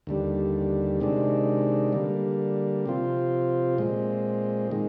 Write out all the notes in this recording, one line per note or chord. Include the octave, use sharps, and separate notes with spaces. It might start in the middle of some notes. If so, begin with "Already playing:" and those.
D#2 D3 G3
C3 D#3 G#3 D4
D3 G3 A#3
C3 F3 C4 F4
A#2 G#3 C4
D#3 G#3